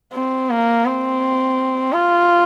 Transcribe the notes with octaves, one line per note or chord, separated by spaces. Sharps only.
C4
A#3
C4
F4